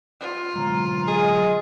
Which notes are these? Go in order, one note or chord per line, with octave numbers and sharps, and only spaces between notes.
F4
D3 F#3 G#3 A#5
G#4 D#5